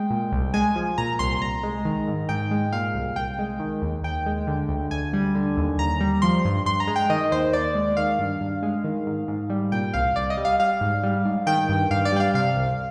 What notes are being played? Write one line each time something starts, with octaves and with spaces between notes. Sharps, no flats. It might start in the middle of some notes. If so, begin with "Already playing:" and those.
Already playing: G#3 G5
A#2
C2
G#3 G#5
F3
A#2 A#5
C2 C6
C2 A#5
G#3
D#3
G#2
G#2 G5
G#3
A#2 F5
C2
C2 G5
G#3
D#3
D#2
D#2 G5
G#3
D3
D2
D2 G#5
G3
D3
D#2
D#2 A#5
G3
F3 C6
G2
G2 C6
A#5
G#3
G5
D#3 D#5
D#2 C5
D#2 D5
G#3
D#3 F5
G2
G2
G#3
D#3
G#2
G#2
G3
A#2 G5
C2 F5
C2 D5
D#5
G3
F5
G3 F5
G#2
G3
G#2
D#3 G5
G2
G2 F5
D5
G3 G5
F5
C3 F5
C2